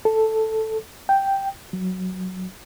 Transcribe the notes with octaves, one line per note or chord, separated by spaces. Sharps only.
A4
G5
F#3